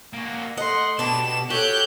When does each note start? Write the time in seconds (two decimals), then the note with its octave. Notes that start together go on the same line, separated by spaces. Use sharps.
0.13 A#3 F#4
0.57 A3 D#5 F#5 C6
0.99 B2 D4 G4 D6 E7
1.50 F#4 G4 A4 C#5 F#6 G6